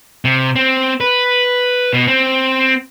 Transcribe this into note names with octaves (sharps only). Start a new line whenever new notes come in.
C3
C4
B4
B2
C4